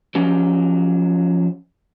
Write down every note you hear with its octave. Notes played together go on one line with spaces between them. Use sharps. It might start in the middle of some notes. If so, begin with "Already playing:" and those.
F3 F#3 C#4 G4